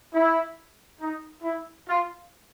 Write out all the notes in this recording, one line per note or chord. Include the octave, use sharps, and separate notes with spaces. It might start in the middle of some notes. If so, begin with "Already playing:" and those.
E4
D#4
E4
F4